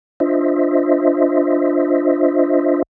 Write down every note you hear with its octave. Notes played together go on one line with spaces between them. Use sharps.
D4 F4 C5 D#5 E5